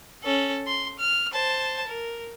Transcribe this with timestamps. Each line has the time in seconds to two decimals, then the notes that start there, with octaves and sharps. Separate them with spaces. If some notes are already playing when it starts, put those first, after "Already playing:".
0.23 C#4 A4
0.67 C6
0.99 F6
1.33 C5 A5
1.87 A#4